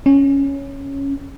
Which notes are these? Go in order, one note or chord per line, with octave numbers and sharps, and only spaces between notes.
C#4